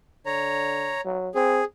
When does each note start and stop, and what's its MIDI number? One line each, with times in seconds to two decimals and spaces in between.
0.26 0.95 50
0.26 1.01 73
0.26 1.01 82
1.05 1.29 54
1.35 1.61 60
1.35 1.64 68